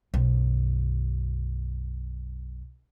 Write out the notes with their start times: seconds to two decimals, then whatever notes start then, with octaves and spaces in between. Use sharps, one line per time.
0.14 B1 F#2